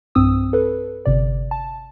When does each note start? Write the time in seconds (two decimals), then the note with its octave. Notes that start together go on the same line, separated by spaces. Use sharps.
0.15 B1 G2 C4 D#6 E6
0.53 A4 B4
1.06 G1 C3 D5
1.51 A5